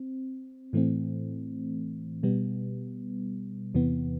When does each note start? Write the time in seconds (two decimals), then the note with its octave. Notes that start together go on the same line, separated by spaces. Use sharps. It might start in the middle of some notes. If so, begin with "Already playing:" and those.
Already playing: C4
0.73 A2 E3 A3 C4
2.23 B2 G3 B3
3.74 E2 C3 E3 B3